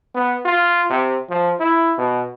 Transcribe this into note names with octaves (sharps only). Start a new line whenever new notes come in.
B3
F4
C3
F3
E4
B2